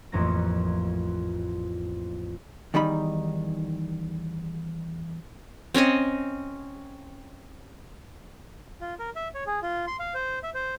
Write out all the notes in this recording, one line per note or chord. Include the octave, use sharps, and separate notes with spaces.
A1 F2 A3 A#3 A#6
E2 D#3 G3 D#4 B5
C4 C#4 C#5 D#5
F4
A#4
E5
C#5
G#4
F4
C6
F5
C5
E5
C5